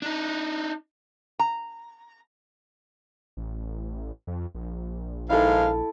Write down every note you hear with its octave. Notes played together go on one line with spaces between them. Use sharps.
D4 D#4
A#5
A1
F2
A#1
G#2 D#3 E4 A4 F5